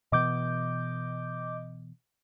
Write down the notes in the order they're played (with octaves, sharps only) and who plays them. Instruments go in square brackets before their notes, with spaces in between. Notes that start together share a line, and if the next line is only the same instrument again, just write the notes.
[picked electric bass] B2 E3 B3 [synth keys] D#5 D6 G6